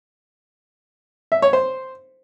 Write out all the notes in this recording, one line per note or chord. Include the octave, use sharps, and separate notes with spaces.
E5
C#5
C5